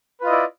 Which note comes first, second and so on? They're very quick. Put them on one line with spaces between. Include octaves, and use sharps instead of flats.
B4 F4 D#5 E4 D5